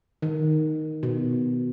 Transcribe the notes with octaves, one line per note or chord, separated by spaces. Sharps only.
D#3
B2